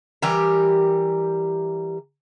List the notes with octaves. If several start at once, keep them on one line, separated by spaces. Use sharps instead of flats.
E3 G3 G4 A#4